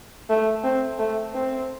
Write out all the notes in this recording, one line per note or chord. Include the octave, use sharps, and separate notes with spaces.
A3
C4
A3
C4